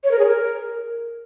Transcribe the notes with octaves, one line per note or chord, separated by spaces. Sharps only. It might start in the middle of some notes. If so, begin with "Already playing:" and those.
C#5
A#4
G#4
A#4